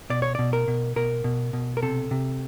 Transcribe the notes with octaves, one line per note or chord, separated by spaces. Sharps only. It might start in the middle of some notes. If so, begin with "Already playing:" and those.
B2 D5
C#5
B2 D5
A#4
B2
B2 A#4
B2
B2
A#4
C3 A4
C3